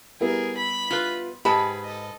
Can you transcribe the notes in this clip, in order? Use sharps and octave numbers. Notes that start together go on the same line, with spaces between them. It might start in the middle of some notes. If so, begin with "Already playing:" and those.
G3 B3 E4 G#4 A#4
B5 B6
F4 B4
G#2 G4 G#4 B4 A5 B5
A4 D#5